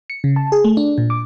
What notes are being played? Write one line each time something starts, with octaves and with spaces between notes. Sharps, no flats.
C#7
C#3
A5
G#4
A3
D4
A#2
D6